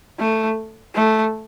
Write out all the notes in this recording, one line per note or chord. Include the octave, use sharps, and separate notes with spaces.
A3
A3